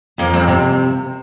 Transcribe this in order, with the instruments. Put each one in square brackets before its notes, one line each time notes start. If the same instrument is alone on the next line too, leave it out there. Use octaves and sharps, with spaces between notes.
[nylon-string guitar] F2 [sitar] F3 A#3
[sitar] G3 C4
[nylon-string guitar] C3 [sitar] G3 C4